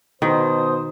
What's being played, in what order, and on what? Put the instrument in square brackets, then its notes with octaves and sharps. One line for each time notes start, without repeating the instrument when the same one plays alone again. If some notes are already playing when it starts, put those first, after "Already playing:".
[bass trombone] B2 [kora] D#3 [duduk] C5 [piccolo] D#6